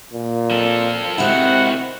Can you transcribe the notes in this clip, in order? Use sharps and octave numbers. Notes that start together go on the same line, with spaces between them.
A#2
F3 A4
C3 D#3 G#3 C4 E4 F#4 F#5